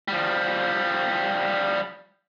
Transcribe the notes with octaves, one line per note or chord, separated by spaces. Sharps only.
F3 G3